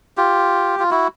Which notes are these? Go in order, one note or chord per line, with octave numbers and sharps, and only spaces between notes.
F4 G4
F4
E4 F#4